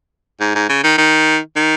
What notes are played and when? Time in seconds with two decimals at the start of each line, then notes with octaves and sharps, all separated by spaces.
0.40 G#2
0.55 G#2
0.69 C#3
0.84 D#3
0.98 D#3
1.56 D#3